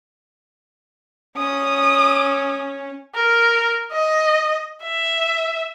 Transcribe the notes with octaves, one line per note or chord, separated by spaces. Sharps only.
C#4 D#6
A#4
D#5
E5